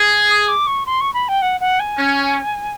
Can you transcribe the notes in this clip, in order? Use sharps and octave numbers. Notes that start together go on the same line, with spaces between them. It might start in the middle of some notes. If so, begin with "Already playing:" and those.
Already playing: G#4
D#6
D6
C#6
C6
C#6
B5
G5
F#5
F#5
G#5
C#4